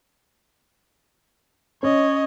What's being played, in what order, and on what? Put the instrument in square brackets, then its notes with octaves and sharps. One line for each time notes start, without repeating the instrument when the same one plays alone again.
[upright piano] C#4 [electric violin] C#5 D#5